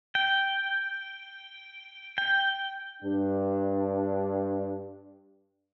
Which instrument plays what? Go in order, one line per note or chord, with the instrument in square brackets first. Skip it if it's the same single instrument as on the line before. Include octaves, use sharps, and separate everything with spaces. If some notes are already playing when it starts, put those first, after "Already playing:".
[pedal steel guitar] G5
G5
[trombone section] G2 D4